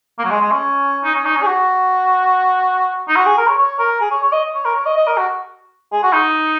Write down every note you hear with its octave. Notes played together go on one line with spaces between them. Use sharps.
A#3
F#3
G#3
G#3
C#4
D#4
C#4
D#4
C#4
G#4
F#4
D#4
F#4
G#4
A#4
C#5
C#5
A#4
G#4
C#5
C#5
D#5
C#5
A#4
C#5
D#5
D#5
A#4
F#4
G#4
F#4
D#4